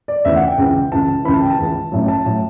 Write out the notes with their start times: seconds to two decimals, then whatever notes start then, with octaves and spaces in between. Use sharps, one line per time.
0.08 D5
0.25 E1 D2 C#3 E3 E5
0.36 F#5
0.47 G5
0.58 C#2 C#3 E3
0.92 C#2 C#3 E3 A5
1.25 C#2 C#3 E3 B5
1.34 A5
1.41 G5
1.50 A5
1.58 C#2 C#3 E3
1.92 A1 A2 F#3
2.08 A5
2.26 A2 F#3